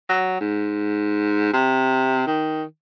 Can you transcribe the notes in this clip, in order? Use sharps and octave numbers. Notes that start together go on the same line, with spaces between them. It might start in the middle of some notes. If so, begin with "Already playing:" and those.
F#3
G#2
C3
D#3